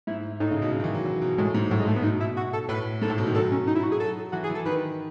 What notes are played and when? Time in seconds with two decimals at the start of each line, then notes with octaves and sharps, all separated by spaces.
0.07 G#2 E4
0.40 A2 D#4
0.51 C#3
0.62 B2
0.72 C#3
0.80 D#3
0.84 E3
0.94 F#3
1.06 F#3
1.22 B2
1.38 A2 G#3
1.54 G#2
1.70 A2 F#3
1.80 G#3
1.88 A3
1.96 B3
2.04 B2 D#4
2.20 E4
2.37 F#4
2.53 A4
2.69 A2 B4
3.02 G#2 A4
3.10 A2
3.18 B2
3.27 D#3
3.35 F#3 A4
3.52 C#4
3.67 D#4
3.75 E4
3.83 F#4
3.92 G#4
4.00 F#3 A4
4.32 E3 F#4
4.44 G#4
4.50 E3
4.55 A4
4.65 D#3 B4